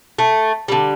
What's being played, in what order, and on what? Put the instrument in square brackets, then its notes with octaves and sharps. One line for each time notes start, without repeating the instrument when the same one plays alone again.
[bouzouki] A3
D3 G3